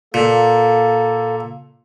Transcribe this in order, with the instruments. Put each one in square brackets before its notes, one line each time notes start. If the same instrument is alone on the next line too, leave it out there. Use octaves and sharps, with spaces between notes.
[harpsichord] A#2 [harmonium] A#3 A4